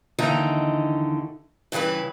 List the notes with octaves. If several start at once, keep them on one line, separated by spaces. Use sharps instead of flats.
D#2 D3 E3 D#4 A#5
G2 C#3 E3 G#4 B4